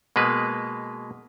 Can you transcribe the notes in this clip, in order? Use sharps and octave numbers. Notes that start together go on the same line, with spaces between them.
B2 G#3 A#3 B4